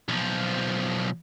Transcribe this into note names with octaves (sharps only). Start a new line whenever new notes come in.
B1 F3